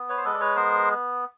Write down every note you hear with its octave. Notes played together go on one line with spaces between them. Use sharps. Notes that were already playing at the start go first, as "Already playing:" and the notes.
Already playing: B3
B4 C#5
C5
G#3 A4 B4
D5
B4 C#5
B3 A#4 C5